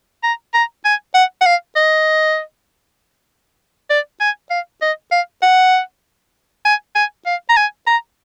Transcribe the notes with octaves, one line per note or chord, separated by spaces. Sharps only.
A#5
A#5
G#5
F#5
F#5
F5
D#5
D5
G#5
F5
D#5
F5
F#5
G#5
G#5
F5
A#5
G#5
A#5